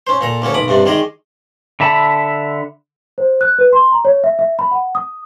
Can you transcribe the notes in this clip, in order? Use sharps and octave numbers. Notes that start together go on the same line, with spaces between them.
C#4 C5
A#2 A4 A#5
D2 A#3 C#4 A4
B1 B5 D6 D#6
G2 C3 D4
D#3 G#3 G#4 D5 D#5
D3 E5 A5 B5
C5
F#6
B4
C6
A#5
C#5
E5
E5
B5
F#5
D#6